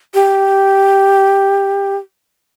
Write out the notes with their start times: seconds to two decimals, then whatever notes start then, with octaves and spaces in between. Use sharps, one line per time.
0.14 G4